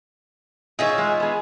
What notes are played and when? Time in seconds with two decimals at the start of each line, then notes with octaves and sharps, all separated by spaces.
0.79 D#4 F4 G#4 C#5 E5
0.98 G#3
1.20 B3 G#4